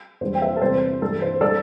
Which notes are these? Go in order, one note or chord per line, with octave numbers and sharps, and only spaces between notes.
E2 D3 G3 C5
G5
C5 E5
A4
E2 C3 G3 C5
G2 E3 G3 A4
C5
D3 G3 A4 D5